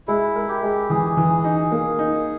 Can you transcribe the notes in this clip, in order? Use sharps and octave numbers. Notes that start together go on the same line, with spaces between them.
G#3 E4
A#4
G4
G#3
E3 G#4
E3
D#4
A#3
D#4